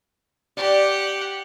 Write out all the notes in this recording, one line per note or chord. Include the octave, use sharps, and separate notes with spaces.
G4 D5 F#5